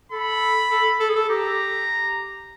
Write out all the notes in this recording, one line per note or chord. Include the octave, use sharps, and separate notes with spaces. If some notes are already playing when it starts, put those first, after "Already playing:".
A4 B5
A4
A4
G#4
A4
G4 A#5